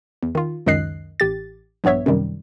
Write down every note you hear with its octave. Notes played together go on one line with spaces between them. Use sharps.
E2
D#3 F4
C#2 F#2 D#3 D#5 F#6 C7
A1 G4 A6
A#1 G2 B3 C#5 E5
F#2 C3 D#3 G3